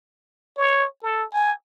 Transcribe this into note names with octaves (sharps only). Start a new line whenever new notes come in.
C#5
A4
G#5